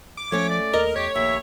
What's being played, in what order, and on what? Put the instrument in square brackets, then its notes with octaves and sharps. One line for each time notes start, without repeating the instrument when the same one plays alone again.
[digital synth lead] D6
[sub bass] F3 [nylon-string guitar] A3 C#4 [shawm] C#5
[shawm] D5
[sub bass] D#2 [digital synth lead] A#4 [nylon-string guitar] D#5
[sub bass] E2 [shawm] G4 [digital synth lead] C#5
[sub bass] A#1 [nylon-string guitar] D#2 [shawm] E5